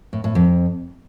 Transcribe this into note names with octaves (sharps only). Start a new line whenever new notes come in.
A2
A2
F2